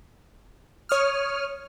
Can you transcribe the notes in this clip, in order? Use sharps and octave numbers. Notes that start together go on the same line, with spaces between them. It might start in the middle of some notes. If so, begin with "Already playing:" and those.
C#5 D#6 F6